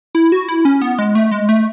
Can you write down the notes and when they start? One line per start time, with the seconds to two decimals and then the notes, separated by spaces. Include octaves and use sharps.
0.15 E4
0.32 F#4
0.49 E4
0.65 C#4
0.82 B3
0.99 G#3
1.15 A3
1.31 G#3
1.49 A3